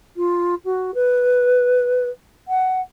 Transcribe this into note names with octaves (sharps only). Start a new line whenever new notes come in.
F4
F#4
B4
F#5